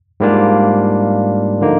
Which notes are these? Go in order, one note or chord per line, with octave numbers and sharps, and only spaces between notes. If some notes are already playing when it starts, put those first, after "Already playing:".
G#2 G3 A#3 D4 F4
D3 F3 A#3 D#4